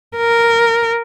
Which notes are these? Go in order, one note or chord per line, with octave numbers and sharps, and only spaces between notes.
A#4